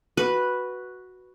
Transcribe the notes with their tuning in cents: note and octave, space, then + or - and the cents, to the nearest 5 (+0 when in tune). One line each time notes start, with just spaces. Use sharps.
F#4 +0 B4 -5